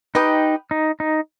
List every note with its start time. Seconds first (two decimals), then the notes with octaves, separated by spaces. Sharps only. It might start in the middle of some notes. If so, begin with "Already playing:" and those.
0.15 D#4 G4 B4 D#5 G5
0.71 D#4
1.00 D#4